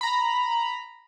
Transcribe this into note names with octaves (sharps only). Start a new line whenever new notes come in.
A#5 B5